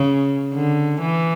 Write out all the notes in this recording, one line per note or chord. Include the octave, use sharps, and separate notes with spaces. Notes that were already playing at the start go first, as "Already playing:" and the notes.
Already playing: C#3
D3
E3